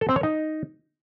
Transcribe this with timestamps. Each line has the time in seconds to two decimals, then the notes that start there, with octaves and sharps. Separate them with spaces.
0.01 A4
0.09 C4
0.16 C#5
0.23 D#4